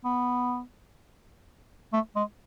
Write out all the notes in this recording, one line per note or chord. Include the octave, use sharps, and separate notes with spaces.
B3
A3
G#3